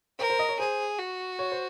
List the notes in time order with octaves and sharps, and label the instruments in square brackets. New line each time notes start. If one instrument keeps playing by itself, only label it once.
[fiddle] A#4 [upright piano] C5
[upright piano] C5
D#5
C#5
[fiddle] G#4 [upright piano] C5
[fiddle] F#4
[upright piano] C#5
C5